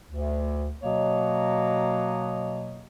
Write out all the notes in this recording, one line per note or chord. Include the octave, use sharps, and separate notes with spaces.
D2
B2 F#3 A#3 C#5 D#5